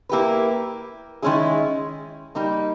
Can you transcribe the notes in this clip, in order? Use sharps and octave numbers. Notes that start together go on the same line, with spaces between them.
A#3 E4 G4 B4
D#3 G#3 C#4 E4 G#4
G3 A#3 D#4